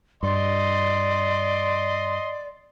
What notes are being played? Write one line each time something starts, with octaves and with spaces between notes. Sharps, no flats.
G2 D5 D#5 C6